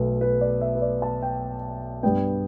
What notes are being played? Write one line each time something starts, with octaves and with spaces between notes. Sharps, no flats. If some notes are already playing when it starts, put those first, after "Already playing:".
Already playing: B1 B2 A3 B4
B4
D5
E5
B4
D5
A5
G5
G2 G3 B3 G5